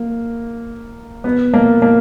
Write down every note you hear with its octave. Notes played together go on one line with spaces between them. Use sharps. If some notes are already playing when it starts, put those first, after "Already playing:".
Already playing: A#3
B3
A#3
A#3